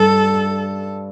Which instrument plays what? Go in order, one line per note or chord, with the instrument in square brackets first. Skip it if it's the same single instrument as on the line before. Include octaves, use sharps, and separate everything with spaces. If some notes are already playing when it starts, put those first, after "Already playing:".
Already playing: [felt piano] G2 [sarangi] A4